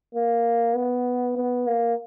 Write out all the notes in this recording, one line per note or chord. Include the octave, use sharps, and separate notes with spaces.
A#3
B3
B3
A#3